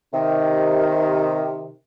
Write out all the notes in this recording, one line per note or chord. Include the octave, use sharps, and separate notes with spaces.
C3 D#3